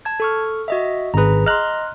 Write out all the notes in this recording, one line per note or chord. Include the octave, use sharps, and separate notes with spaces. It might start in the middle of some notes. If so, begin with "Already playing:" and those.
A5 G#6
A4 C#6 F6
F#4 D#5 E5
G#1 G#4 B4 A#5
D#5 A#5 C6 F6 F#6